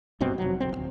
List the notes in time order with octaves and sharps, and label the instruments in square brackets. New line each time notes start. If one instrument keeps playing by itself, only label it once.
[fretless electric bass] G#1 G2 B2 C4
F1 F#3
F#1 B1 C4
D1 C2